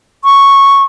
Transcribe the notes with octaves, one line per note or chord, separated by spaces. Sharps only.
C#6